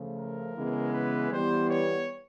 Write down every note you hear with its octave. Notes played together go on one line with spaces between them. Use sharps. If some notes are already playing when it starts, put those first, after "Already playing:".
Already playing: C#3 F3 A3
A#4
C#3 E3 G#3 B3
B4
E3 G3 B3 C5
C#5